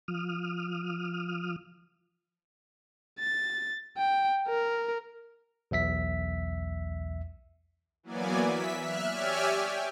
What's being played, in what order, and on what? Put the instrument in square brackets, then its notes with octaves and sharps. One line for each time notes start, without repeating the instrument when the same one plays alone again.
[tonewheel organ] F3 D#6 F6
[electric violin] A6
G5
A#4
[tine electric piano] B1 E2 E5 B6
[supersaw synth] E3 F#3 A#3 B3 D5 G#5
E5 B6
E5 F6 F#6
G4 C#5 D5 E5 G#5 F6
G5